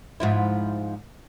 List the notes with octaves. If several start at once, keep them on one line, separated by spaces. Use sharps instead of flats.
G#2 F3 E4